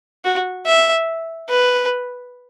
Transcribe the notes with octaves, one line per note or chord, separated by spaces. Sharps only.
F#4
E5
B4